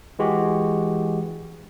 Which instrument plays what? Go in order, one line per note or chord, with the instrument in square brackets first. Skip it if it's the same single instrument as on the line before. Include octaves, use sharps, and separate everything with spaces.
[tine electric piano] E3 G#3 F#4 G4